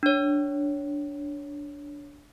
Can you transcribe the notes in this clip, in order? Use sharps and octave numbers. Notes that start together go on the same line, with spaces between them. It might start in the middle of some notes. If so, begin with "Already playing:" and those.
D4 C#5